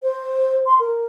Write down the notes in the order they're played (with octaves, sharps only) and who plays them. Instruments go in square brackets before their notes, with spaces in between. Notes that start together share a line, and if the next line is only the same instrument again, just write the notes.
[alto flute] C5
C6
A#4